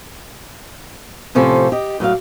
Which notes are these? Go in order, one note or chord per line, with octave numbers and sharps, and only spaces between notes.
A2 C3 F3 C#4 A4
G4 D#5
A2 F#3 D5 F5